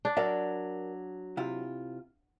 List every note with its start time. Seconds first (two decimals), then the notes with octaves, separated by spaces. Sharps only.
0.05 D4
0.17 F#3 A#4 D5 E5
1.37 C3 E4 F4